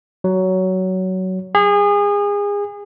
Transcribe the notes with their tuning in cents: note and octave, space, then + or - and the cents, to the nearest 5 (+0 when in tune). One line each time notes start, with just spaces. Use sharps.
F#3 +15
G#4 -30